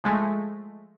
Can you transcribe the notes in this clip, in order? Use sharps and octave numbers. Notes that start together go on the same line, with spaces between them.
F3 G#3 A3